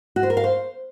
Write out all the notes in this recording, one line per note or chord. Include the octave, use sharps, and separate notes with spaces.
F#4
C5
A#4
F5
C5